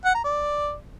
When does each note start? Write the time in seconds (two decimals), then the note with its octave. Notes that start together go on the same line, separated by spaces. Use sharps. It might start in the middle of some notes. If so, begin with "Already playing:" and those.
0.05 F#5
0.15 A#5
0.24 D5